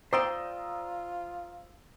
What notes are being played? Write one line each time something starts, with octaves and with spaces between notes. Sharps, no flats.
F4 C5 D5 G5 A#5 D#6 E6